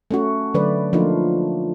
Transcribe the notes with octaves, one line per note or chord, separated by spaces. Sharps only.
A3 C#4 F#4
D3 F#3 A3 B4 D5
F3 A3 A#3 D4 D#4 F4